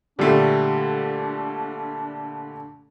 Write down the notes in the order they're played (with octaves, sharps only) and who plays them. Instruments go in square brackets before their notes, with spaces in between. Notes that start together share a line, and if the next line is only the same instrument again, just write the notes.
[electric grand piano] A#2 D3 [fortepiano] G3 A3 [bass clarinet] D4